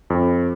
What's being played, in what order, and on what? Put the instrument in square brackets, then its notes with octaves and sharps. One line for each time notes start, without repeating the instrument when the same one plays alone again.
[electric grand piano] F2